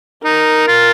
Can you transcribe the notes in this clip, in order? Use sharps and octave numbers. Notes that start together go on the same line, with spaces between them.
D#4 A#4
F4